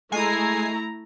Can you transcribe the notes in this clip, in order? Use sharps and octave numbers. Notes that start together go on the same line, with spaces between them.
G#3 A3 E4 G#5 A#5 C7